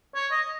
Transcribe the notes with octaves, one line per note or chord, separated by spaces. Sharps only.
C#5
D#5